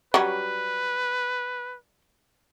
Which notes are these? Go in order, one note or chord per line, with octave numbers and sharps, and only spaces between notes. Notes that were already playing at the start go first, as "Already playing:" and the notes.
F#3 G3 C#4 B4